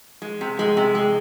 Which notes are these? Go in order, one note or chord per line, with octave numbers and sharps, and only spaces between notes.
G#3
C3
G#3
C3
G#3